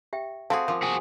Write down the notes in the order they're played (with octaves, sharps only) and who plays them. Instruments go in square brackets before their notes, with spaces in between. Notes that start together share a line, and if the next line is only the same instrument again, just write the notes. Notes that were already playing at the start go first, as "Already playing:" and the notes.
[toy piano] G4 E5 G5
[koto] C4 F#4 G#4 [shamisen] A4 [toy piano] F5
[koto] F3 [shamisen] F4 [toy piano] A#4 D6
[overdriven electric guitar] F#4 G#4